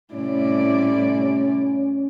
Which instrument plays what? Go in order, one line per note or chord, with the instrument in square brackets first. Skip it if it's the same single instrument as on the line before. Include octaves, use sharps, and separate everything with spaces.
[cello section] A2 C3 G3 [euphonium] C#4 [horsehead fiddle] E4 D5